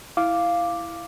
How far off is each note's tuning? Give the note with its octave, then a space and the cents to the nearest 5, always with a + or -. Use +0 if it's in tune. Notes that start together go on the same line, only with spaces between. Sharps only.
E4 +0 F5 -5 D6 +0